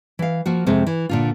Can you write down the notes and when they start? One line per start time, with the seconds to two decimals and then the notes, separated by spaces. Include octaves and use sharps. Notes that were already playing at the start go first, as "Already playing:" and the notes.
0.19 E3 F5
0.46 F3 A#3 F#4
0.67 F2 C3 G#3 C4
0.87 E3
1.09 A#2 D3 F4